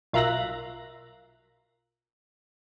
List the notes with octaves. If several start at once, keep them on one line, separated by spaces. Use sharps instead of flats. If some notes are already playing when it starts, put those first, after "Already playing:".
B1 F4 A#4 E5 F#6 A#6